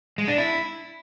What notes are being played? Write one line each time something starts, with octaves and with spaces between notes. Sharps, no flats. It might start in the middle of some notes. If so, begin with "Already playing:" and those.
G#3
D4
E4